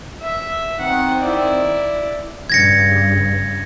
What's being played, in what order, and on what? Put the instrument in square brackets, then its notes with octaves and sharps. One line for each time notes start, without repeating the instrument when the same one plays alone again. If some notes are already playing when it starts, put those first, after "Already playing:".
[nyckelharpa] E5
[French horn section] D#3 C4 [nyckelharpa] F#5
[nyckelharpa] E4 D5
[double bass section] G2 C#3 [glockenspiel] G#6 A#6 C#7